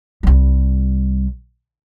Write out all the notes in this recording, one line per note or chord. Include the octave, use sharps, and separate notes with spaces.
C2 G3